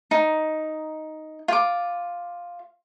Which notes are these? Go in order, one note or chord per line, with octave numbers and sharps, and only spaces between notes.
D#4
F4 D6